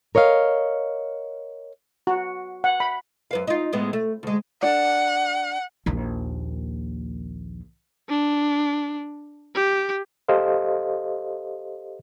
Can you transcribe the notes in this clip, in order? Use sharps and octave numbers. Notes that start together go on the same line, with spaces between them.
A#4 C#5 D#5 F5
F#4
F#5
B5
F#2 B4 F5
D#4 F4
A2 G#3 B3
A3
D2 G#3
D4 A4 D5 F#5
A#1 D#2
D4
G4
G4 A4 C5 D#5 F5